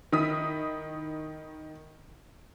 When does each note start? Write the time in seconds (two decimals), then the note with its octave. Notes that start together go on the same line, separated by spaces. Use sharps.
0.12 D#3 E4 D#6 B6